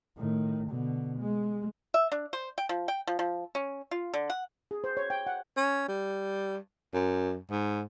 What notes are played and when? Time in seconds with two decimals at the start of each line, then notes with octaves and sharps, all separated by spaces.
0.17 A2 D#3
0.69 B2 D3
1.19 G#3
1.94 E5
2.12 D4
2.33 C5
2.58 G5
2.69 F3
2.88 G5
3.07 F3
3.19 F3
3.55 C#4
3.91 F4
4.14 D3
4.30 F#5
4.71 G#4
4.84 C5
4.97 C#5
5.10 G5
5.27 F#5
5.57 C#4
5.88 G3
6.94 F#2
7.50 G#2